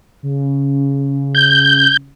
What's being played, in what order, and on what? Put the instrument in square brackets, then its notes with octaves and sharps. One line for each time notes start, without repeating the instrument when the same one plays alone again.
[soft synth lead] C#3
[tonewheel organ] G6